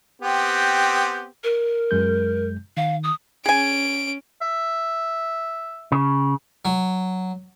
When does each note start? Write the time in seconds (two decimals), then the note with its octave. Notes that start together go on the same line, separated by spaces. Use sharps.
0.22 B3 C4 G4
1.43 A#4
1.91 F#2 G#3 G6
2.77 D#3 F5
3.03 D#6
3.46 C#4 G#4 G#5 D7
4.41 E5
5.92 C#3
6.65 F#3